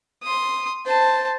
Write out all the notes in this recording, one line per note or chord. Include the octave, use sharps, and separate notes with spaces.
C6 D#6
C5 A5